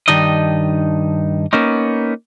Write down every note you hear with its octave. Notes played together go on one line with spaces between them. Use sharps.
G2 D#3 D4 D#4 D#5
A#3 B3 C#4 D#4